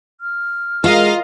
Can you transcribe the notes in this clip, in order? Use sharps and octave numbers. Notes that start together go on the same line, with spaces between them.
F6
G#3 F4 F#4 G#4 A#4 D#5 F5